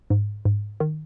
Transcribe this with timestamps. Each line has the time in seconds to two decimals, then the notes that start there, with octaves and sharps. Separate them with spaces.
0.10 G#2
0.45 G#2
0.80 D#3